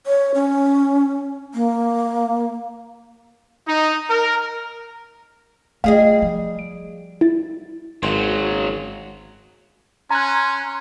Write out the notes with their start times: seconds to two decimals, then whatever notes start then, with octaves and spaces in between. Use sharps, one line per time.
0.07 C#5
0.34 C#4
1.54 A#3
3.67 D#4
4.10 A#4
5.84 G3 A3 F4 G#4 D#5 F5
6.22 F3
6.59 D7
7.21 E4 A6
8.03 G#1 C#3 F#3 C5
10.10 C#4 G#5 A#5 C6 F#6